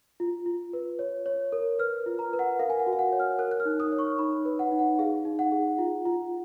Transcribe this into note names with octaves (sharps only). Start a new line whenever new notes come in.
F4
F4
B4
C#5
C#5
A#4
B4 F6
F4
A#5
B4
F#5
A#4 F5
G#5
F#5
F#4
F5
F#5
C#5
F6
A#4 F#6
F#6
F6
D#4
D#6
C#5
C#6
D#4 B5
B4
F#5
D#4
F#5
G#4 F5
D#4
F#5
G#4
F4
F4